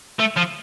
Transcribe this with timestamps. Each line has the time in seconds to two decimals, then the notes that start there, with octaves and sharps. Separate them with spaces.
0.19 A3
0.36 F3